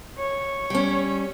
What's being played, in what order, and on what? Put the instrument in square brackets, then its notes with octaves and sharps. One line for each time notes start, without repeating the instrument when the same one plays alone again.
[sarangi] C#5
[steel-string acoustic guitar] G3 C#4